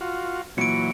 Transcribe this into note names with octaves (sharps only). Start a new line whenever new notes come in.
F4 F#4
A#2 E3 F#3 C#7 D7